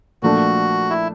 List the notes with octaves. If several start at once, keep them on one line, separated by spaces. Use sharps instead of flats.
A#2 F3 A3 D4 F#4
E4